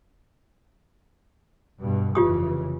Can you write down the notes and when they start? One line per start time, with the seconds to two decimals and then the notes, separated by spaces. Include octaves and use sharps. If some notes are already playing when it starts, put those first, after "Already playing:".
1.80 G2 B2
2.15 F1 C#3 E3 F4 G4 D#6